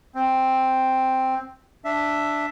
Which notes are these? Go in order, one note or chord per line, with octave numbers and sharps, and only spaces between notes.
C4
D4 E5